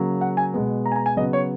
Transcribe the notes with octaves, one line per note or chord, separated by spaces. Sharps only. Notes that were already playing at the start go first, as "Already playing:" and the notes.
Already playing: C#3 F#3 A#3
F#5
G#5
B2 G#3 B3
A#5
G#5
A#5
G#5
C#3 F#3 B3 D#5
C#5